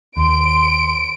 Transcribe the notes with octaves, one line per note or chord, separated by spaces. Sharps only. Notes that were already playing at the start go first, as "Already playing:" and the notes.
D#2 C6 D7